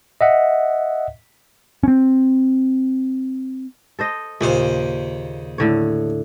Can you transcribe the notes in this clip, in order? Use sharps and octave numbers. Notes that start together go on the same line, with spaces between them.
D#5 E5 F#5
C4 C#4
A4 C5 D#5
D#2 A#2 C#3 C5
A2 D3 C#5